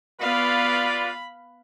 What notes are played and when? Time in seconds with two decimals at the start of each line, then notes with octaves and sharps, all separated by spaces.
0.21 B3 F4 B4 D5 F5 B5